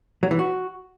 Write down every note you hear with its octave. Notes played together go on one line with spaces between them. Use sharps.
F#3
E3
F#4